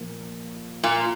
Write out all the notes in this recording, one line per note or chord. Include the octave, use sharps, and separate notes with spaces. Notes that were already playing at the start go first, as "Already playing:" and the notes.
Already playing: A#2 F3 A#3
A#2